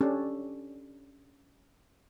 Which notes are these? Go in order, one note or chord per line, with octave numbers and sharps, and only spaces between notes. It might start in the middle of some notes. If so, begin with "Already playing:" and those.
C#4 D4 G4 A4